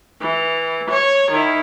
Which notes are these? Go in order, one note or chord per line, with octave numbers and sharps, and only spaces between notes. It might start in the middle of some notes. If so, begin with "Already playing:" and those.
E3
C#5
D#3 E4